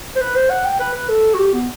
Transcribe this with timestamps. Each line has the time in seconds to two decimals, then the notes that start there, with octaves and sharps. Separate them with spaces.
0.16 C5
0.21 B4
0.36 C5
0.50 F#5
0.65 G5
0.80 B4
0.94 B4
1.09 A4
1.34 F#4
1.38 G4
1.53 B3